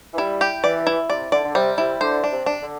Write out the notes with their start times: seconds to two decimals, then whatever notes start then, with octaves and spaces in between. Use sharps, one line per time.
0.14 E3
0.18 G3 E4
0.41 G4
0.64 E3 D5
0.87 E4
1.09 C3 D5
1.32 D3 D5
1.44 D3
1.55 C3 G3
1.78 C3 E4
2.01 D3 C5
2.24 D4
2.32 C3
2.46 D4
2.62 D3